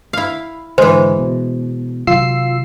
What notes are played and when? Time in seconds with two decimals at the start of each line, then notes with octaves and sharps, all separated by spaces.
0.13 E4 F5
0.78 G#2 D3 E3 G#3 C5
1.19 B2
2.07 C3 D#3 F#3 F4 E6 C7